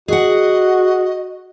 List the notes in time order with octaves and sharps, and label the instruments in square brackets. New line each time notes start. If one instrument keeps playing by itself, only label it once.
[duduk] F#4 [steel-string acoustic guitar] G#4 F#5 [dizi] D#5